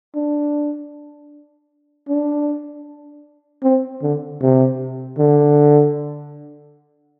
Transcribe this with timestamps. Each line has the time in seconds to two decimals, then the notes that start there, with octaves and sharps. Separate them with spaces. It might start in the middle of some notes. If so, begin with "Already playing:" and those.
0.15 D4
2.09 D4
3.63 C4
4.02 D3
4.41 C3
5.18 D3